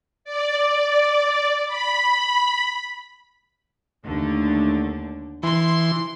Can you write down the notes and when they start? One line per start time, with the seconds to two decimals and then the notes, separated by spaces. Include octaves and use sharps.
0.25 D5
1.67 B5
4.06 D#2 D3 A3
5.43 E3 C6